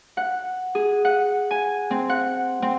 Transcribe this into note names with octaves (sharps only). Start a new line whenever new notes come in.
F#5
G#4
F#5
G#5
C4
F#5
C4